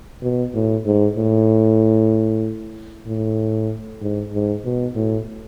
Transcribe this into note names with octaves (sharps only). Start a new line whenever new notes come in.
B2
A2
G#2
A2
A2
G#2
G#2
B2
A2